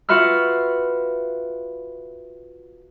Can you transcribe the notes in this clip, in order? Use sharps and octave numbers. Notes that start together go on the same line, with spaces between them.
F4 F#4 B4 E5 B5 F6